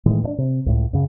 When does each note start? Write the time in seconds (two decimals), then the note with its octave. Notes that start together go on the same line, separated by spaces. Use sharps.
0.06 A2 D#3 E3 G#3
0.24 G2 D4
0.38 C3
0.66 C#2 A2
0.93 F#2 C#3